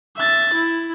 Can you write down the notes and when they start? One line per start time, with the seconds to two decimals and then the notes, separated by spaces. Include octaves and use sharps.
0.17 E5 A6
0.54 E4